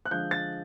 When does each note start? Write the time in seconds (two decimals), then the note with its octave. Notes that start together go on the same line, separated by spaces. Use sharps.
0.06 F#6
0.11 D3 F3 G#3 G6
0.31 A6